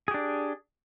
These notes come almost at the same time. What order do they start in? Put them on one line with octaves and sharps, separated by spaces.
G#4 G4 D4